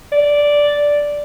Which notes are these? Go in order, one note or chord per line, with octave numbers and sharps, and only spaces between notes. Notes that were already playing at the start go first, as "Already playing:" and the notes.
D5